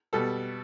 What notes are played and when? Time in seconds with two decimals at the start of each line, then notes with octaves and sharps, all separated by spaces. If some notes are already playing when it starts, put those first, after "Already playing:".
0.13 B2 G3 B3 A4